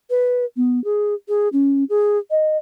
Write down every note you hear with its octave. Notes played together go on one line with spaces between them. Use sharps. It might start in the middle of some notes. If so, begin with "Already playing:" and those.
B4
B3
G#4
G#4
C#4
G#4
D#5